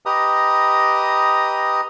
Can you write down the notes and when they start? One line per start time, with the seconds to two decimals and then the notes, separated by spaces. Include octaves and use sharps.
0.06 G4 B4 D#5 A#5 D#6